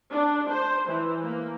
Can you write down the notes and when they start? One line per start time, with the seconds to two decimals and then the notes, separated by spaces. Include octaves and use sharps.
0.12 D4
0.51 C5
0.89 E3
1.24 A#3